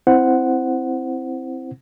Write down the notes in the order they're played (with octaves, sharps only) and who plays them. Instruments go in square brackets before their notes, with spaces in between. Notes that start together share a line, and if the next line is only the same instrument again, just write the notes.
[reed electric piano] C4 E4 C5 F#5